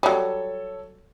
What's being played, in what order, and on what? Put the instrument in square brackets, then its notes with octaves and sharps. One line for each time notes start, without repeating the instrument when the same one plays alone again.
[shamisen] F#3 G3 [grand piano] A4 C#5